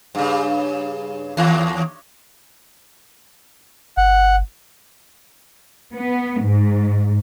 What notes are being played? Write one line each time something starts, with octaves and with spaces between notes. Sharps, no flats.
G2 C#3
D#2
G1 F#5
B3
G#2